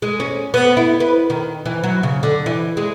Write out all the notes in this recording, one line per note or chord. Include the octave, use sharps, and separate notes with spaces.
G#3
C#4
B3
E4
B4
D#3
E3
F#3
C#3
D3
E3
G#3